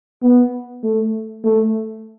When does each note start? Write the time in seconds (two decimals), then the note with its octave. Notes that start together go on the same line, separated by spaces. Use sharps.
0.22 B3
0.83 A3
1.44 A3